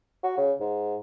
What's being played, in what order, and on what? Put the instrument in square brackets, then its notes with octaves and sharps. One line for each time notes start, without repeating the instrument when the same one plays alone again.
[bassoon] F#4
C#3
G#2